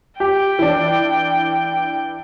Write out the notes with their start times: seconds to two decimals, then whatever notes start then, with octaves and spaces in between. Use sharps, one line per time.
0.20 G4 G5
0.59 E3 D4